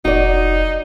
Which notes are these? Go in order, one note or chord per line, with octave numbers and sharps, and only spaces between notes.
F1 D#4 F#4 D5